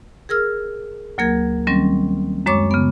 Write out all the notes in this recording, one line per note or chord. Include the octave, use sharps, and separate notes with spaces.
G#4 A#4 E6 F6
D2 F#3 A#3 A#4 G#6
D#3 F#3 G3 C4 C#4
F#2 G#3 C#5 C#6 D6
C#3 B3